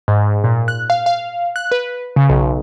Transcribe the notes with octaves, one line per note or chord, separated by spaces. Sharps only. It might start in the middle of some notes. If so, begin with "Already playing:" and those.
G#2
A#2
F#6
F5
F5
F#6
B4
C#3
B1